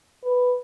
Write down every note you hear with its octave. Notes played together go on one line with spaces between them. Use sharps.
B4